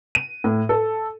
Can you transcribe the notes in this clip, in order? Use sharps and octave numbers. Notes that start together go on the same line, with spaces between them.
D#7
A2
A4